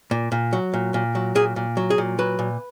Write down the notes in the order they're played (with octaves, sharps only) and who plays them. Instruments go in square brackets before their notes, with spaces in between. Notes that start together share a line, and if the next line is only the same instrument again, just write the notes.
[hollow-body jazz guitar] A#2
A#2
F#3
A#2
A#2
F#3
A#2 G#4
A#2
F#3
G#4
A#2
F#3 B4
A#2